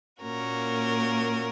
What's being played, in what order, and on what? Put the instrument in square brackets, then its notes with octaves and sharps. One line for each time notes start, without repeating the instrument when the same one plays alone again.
[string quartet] A#2 A#3 C#4 F#4 A#4